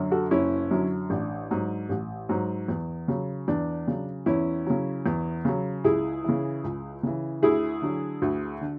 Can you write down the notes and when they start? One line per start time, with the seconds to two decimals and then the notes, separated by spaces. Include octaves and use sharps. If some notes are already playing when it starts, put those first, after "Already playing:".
Already playing: F#2 D3 F#3
0.11 F#4 A4
0.31 F#1 C#4 E4
0.71 F#2 D3 F#3
1.10 A1 D4
1.51 G#2 F#3
1.89 A1
2.29 G#2 F#3
2.68 E2
3.08 C#3 F#3
3.48 E2 D4
3.87 C#3 F#3
4.26 E2 C#4 E4
4.66 C#3 F#3
5.06 E2
5.45 C#3 F#3
5.84 C#2 E4 G#4
6.24 C#3 E3
6.64 C#2
7.03 C#3 E3
7.42 D2 E4 G#4
7.82 D3 F#3
8.22 D2
8.61 D3